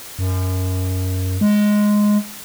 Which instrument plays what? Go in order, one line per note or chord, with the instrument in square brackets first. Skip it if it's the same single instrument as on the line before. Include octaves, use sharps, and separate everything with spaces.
[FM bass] F#2
G#3